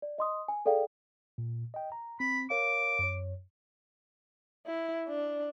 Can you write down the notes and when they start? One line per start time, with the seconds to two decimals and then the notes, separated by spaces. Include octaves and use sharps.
0.02 D5
0.18 D#5 C6 D#6
0.48 G#5
0.65 G#4 A4 D5 F5 G5
1.38 A#2
1.74 D#5 G5
1.92 A#5
2.20 C4 B5
2.50 A#4 C#5 F5 D6
2.99 F#2 C#5
4.66 E4
5.08 D4